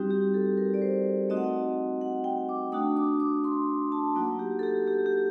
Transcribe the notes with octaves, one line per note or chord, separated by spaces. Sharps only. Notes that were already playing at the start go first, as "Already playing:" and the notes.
Already playing: G3 C4 D#4 F#4 G4
G4
A4
A#4
D5
C5
A3 C4 D#4 F#4 D#5
F#5
D#5
F#5
G5
D6
A3 D4 F#4 D#6
D6
D6
C6
A5
F#3 A#3 D#4 F#4 F#5
G4
A4
G4
G4
G4